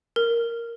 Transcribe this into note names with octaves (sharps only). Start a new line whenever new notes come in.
A#4